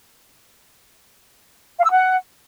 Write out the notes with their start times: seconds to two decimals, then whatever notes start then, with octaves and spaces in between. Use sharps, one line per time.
1.79 F5
1.84 E6
1.90 F#5